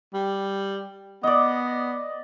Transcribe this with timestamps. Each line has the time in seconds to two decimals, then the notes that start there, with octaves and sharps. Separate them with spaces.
0.14 G3
1.23 B3 D5 D#5